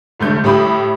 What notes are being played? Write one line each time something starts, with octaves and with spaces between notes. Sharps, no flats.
F1 D3 A3 G6
A2 G3 G4 E5 B5 D#6